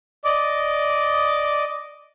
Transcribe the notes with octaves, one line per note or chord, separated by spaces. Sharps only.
D5 D#5 D6